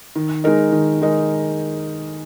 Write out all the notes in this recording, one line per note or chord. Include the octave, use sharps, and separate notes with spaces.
D#3
G#3 D#4 A#4 D#5
D#3
G#3 D#4 A#4 D#5